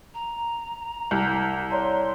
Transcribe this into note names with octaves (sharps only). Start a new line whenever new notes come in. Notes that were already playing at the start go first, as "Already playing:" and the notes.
A#5
C2
C#5 D5 A#5 C6